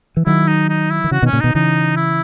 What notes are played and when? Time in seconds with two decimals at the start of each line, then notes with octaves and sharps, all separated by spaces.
0.17 E3
0.26 D#3 F#3 E4
0.48 D#4
0.69 D#4
0.90 E4
1.04 D#3
1.11 C#3 E3 F#4
1.22 B2 D#3 C#4
1.33 A#2 C#3
1.40 B2 D#3 D#4
1.55 C#3 E3 D#4
1.97 E4